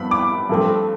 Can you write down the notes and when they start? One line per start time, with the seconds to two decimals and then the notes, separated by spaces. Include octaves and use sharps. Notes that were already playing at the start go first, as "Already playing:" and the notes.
Already playing: G2 F3 B3 B5
0.11 D6
0.49 G2 F3 A3 C4